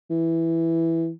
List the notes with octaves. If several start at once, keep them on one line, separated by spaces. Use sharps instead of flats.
E3